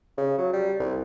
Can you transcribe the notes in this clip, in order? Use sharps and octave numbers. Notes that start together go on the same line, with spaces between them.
C#3
F#3
G3
C2